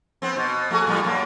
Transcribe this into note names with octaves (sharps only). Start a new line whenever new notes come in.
B3 C4
B2
A3 F#4 G#4
A2 G3
F#2 A#3